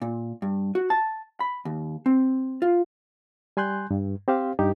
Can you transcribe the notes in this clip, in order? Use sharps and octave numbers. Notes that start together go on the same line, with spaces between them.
A#2
G2
F#4
A5
B5
D#2
C4
F4
G3 G#5 C6 F#6 G6
G2
C4 G4 C5 F5
G2 D#4 G4